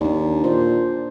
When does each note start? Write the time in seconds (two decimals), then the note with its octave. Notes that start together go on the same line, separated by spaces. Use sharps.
0.01 D#2 D4 D5
0.44 A#2 C5